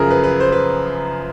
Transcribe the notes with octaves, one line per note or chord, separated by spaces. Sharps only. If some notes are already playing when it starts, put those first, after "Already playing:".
Already playing: F#2 C#3 F3 G#4 A#4
B4
B4
C5
B4